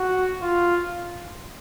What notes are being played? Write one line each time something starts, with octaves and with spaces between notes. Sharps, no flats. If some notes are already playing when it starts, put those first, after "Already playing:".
Already playing: F#4
F4